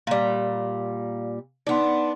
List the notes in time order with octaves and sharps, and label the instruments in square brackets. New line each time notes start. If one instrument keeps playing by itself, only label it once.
[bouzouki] A#2 G3 [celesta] F5
[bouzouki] B3 D4 [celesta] D#4 F#5 C6